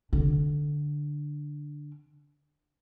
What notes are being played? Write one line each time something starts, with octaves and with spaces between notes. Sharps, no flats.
D3 D4